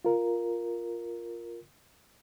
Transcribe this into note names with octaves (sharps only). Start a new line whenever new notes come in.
F4 A#4